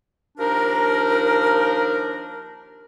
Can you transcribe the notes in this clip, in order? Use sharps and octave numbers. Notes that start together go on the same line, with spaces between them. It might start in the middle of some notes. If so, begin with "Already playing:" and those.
D#2 F3 D4 D#4 A#4